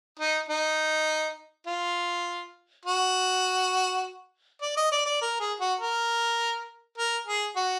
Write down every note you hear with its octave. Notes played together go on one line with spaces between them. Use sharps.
D#4
D#4
F4
F#4
D5
D#5
D5
D5
A#4
G#4
F#4
A#4
A#4
G#4
F#4